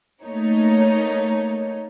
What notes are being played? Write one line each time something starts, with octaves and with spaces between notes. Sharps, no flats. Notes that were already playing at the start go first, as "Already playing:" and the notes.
A3 A#3 D#4 C#5